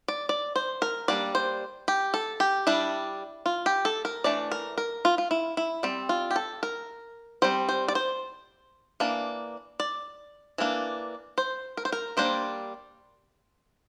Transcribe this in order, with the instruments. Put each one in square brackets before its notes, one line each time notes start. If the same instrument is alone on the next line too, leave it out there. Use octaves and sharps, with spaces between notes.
[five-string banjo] D5
D5
C5
A#4
G3 A#3 D4 D5
C5
G4
A4
G4
G3 D4 E4
F4
G4
A4
A#4
E3 A3 D4 D5
A#4
A#4
F4
F4
E4
E4
G3 C4
F4
G4
A4
A#4
G3 C4 C5
C5
D5
C5
E3 A#3 D4
D5
E3 A#3 D4
C5
A#4
C5
A#4
G3 A#3 D4 C5